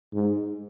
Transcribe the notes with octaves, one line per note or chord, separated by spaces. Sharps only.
G#2